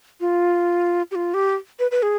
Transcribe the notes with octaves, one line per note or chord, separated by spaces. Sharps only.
F4
G4
F4
G4
B4
B4
G#4